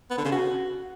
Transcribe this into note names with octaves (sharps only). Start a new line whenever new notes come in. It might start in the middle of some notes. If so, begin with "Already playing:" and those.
B3
D3
C#3
F#4